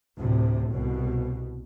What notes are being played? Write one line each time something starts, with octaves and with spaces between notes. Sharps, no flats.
D2 A2 C3
C2 B2